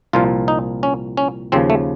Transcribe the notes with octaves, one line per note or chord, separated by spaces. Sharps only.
C2 A#2 F3 F4
D#4
C#4
C#4
D#2 C#3 F3 C4
A3